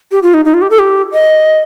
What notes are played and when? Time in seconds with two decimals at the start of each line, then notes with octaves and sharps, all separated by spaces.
0.12 G4
0.23 F4
0.34 D#4
0.45 D#4
0.54 F4
0.62 G4
0.70 A4
0.79 G4
1.12 D#5